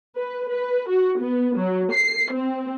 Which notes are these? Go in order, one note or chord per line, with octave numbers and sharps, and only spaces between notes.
B4
B4
F#4
B3
F#3
C7
C4